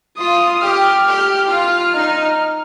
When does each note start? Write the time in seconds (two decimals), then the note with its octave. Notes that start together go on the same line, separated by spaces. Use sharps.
0.18 F4 D#6
0.61 G4 F6
1.05 G4
1.49 F4 F6
1.93 D#4